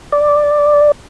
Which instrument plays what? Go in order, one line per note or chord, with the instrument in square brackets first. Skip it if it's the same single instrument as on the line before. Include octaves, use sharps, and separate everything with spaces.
[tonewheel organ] D5